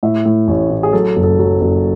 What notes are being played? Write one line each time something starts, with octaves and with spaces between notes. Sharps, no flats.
A2 E5
A2
A1 C#5
A2
G#4
F#3 A4
F#1
A4
F#3
F#1